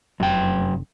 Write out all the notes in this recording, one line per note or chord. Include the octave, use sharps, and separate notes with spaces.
F1 F#2 G5